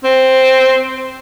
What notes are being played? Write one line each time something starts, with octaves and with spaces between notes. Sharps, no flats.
C4